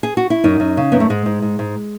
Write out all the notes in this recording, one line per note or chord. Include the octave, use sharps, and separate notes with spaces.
G#4
F#4
E4
F#2 D#4
F#2
C#3
F#2 B3
A3
G#2 G#3
G#2
G#2
G#2